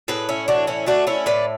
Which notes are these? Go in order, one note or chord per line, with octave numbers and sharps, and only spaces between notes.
A2 G#4 B4
C#4 E4
E3 D4 F#4
C#4 E4
A3 D4 F#4
C#4 E4
A2 B4 D5